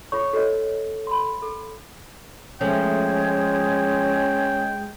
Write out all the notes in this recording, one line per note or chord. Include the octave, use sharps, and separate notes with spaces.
F4 A4 C#5 C#6
F#4 A4 C#5 D#5
B5 C6
A4
F3 G#3 A3 C#4 G5